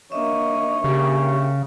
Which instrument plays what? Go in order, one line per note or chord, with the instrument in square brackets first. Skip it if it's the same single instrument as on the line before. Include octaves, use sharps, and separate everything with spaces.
[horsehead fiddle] A#3 D#5 [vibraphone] D4 E5 [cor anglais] C#5
[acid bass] C#3 [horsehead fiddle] A#3 G4